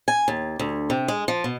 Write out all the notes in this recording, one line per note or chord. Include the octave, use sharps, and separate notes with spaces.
G#5
D#2
D2
C3
G#3
F3
B2